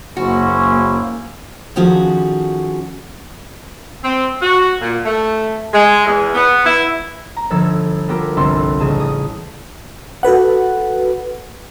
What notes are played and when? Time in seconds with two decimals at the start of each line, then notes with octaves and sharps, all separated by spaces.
0.17 F#1 A#3 C#4 E4 F#4 C5
1.76 D#3 F3 C#4 F#4 G#4 A4
4.04 C4
4.41 F#4
4.81 A#2
5.05 A3
5.74 G#3
6.06 E2
6.35 B3
6.65 E4
7.37 A#5
7.50 G1 F3 A4 E6 G#6
8.08 B3 F4 G4 A4 A#4
8.37 G1 C2 C4 A4 C6
8.80 A1 C#3 G#4 A5
9.00 D#6
10.23 F#4 A4 B4 F#5